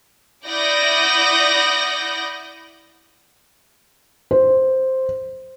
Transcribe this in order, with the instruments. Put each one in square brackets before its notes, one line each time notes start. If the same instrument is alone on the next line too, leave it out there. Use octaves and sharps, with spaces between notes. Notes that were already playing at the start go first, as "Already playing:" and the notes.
[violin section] E4 D5 F#5 D#6 G6 A#6
[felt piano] C5